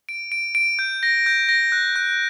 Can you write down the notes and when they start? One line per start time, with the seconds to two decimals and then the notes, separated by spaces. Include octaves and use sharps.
0.09 D7
0.32 D7
0.55 D7
0.79 G6
1.03 A#6
1.26 G6
1.49 A#6
1.72 F#6
1.96 F#6